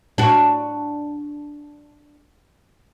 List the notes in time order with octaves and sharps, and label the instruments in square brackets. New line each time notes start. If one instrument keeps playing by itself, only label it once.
[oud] D4 F#4